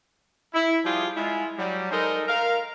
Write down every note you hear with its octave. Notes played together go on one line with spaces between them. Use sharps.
E4
F3 G3 F4 G4 G#4
G#3 E4 F4
F#3 G3
G#3 D#4 A4 A#4 C5 D#5
A#4 F5